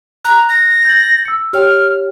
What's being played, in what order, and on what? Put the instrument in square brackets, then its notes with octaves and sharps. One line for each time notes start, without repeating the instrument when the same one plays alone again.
[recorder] A#5 [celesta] F#6
[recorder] A#6
[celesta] G6 A6 F#7
E6 C#7
[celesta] G4 C#5 G5 [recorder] F6